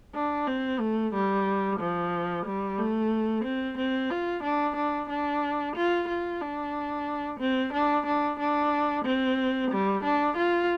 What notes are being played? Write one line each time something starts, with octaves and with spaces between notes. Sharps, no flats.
D4
C4
A3
G3
F3
G3
A3
C4
C4
F4
D4
D4
D4
F4
F4
D4
C4
D4
D4
D4
C4
G3
D4
F4